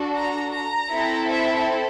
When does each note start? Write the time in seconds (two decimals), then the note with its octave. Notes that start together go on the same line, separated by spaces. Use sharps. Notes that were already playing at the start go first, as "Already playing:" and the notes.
Already playing: D4 F#4 A4
0.16 A#5
0.54 A#5
0.91 C4 E4 A4
1.29 E5